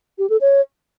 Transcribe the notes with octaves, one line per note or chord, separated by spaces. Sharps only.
G4
A4
C#5